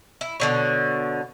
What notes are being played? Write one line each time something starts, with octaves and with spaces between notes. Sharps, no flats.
E4
B2 D3 C#5